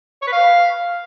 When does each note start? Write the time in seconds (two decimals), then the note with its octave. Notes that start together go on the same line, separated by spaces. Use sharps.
0.22 C#5
0.27 B4
0.33 F5